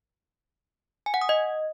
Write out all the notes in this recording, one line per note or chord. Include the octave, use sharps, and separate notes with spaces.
G#5
F#5
D#6
D#5